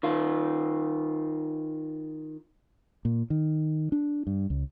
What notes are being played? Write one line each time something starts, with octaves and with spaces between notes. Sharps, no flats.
D#3 F4
A#2
D#3
D4
G2
C#2